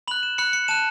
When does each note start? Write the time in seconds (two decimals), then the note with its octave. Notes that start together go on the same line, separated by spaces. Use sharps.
0.08 B5 F#6 F#7
0.23 E7
0.38 B5 F#6 C#7
0.53 C#7
0.68 A5 F#6 E7